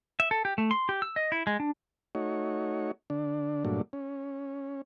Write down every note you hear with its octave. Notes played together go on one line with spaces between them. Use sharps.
E5
A4
G4
A3
C6
G4
E6
D#5
E4
G#3
D4
A3 D#4 F#4 C#5
D3 D4
G2 A#2 F#3 A3 D4
C#4